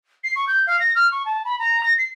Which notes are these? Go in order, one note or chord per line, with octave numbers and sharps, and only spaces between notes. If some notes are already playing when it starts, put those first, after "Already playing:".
C7
C#6
G6
F5
A#6
F6
C#6
A5
B5
A#5
A#6
C7